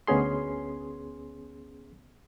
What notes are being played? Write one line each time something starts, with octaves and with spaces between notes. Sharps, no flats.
D2 B3 C#4 G#4 C6